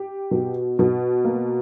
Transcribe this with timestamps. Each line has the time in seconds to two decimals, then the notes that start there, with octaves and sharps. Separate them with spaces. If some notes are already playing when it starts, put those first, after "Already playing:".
Already playing: G4
0.31 B2
0.79 B2
1.24 A#3